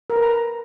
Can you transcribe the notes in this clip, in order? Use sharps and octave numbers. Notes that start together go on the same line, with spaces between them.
A#4
B4
A#5